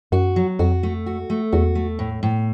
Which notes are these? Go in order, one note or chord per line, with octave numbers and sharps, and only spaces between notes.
F#2 F#4
F#3
F2 F#4
A3
F#4
A3
E2 F#4
A3
A2
A2